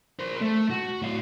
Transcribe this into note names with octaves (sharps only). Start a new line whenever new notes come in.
A#4 C5
A3
F#4
A2 F5